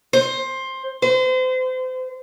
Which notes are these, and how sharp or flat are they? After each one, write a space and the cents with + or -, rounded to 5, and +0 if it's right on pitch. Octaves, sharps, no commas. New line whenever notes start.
C5 +15
C5 -35